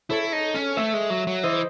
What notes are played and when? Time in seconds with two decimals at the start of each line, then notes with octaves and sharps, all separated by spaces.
0.10 E4 A4 C#5
0.33 D#4
0.54 C#4
0.76 A3 C#5 E5
0.94 G#3
1.10 F#3
1.27 F#3
1.43 E3 C5 D#5